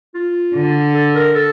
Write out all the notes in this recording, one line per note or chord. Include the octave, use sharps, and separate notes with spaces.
F4
D3
A4
A#4
A4